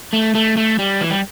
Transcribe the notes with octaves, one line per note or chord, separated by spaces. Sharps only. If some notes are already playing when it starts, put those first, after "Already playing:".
A3
A3
A3
G3
E3
G3